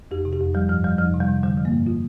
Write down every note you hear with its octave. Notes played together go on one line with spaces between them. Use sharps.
F2 G4
C3
G4
F2
F3 G3
G2 F3
F3 G3
F2 F3
C3
G3
C3
D3 G3
F3
A#3
G2
F4